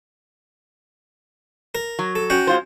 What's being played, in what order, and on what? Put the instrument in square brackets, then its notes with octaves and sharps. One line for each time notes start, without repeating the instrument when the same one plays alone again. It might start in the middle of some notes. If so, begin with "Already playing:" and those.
[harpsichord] A#4
[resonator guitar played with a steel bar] F#3
[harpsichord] A4
C#4 F#4 G5
[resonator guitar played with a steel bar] G#3 F4 C5